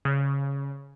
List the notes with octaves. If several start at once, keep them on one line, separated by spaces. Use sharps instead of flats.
C#3